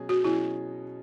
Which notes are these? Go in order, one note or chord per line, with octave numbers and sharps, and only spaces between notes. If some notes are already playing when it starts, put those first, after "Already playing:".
Already playing: B2 F#3 C#4 G#4
F#4
B2 F#3 C#4 E4 G#4